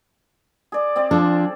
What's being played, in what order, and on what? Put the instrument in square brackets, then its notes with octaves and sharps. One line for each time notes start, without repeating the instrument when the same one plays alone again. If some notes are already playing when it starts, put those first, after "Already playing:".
[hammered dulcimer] G#4 D5
C4 D5
[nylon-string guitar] F3 D4 A4